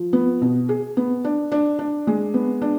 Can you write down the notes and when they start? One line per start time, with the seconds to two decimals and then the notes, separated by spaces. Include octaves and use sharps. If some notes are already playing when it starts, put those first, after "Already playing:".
Already playing: F3
0.13 B3
0.42 B2
0.69 G#4
0.97 B3
1.24 D4
1.52 D4
1.79 D4
2.07 G#3
2.34 B3
2.62 D4